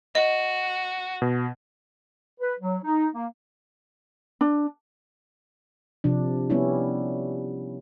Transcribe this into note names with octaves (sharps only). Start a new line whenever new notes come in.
F#4 D#5
B2
B4
F#3
D#4
A#3
D4
C3 F3 D4
G3 B3 C#4 E4